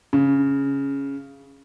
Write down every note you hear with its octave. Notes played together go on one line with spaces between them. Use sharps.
C#3